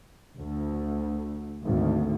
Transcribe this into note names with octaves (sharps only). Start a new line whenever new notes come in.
D2
G#1 D2